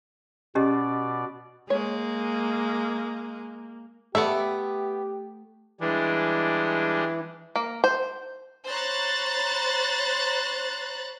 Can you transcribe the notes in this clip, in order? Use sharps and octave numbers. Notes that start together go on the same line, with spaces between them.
B2 C#4 G4 D5 D#5
G#3 A#3 C#5
A3 B3 G4 A4 D5 E5
E3 G3 G#3 D4
A#3
C5
C5 C#5 A#5 B5 F#6 A6